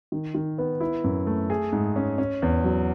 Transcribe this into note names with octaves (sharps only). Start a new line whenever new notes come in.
D#3
D#3
B3
E4
F#2
A3
G#4
G#2
C#4
C#4
E2
F#3